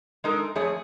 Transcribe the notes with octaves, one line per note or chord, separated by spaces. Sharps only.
G#3 D#4 A4 A#4
F2 A3 G#4 C#5